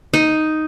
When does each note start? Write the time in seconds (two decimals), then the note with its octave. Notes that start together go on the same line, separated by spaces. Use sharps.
0.14 D#4